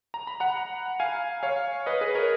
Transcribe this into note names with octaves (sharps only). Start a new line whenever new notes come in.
A#5
B5
F#5 A#5
F5 G#5
C#5 F5
B4 D#5
G#4 B4
A#4 C#5